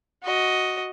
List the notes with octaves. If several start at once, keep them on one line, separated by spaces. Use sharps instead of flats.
F#4 D#5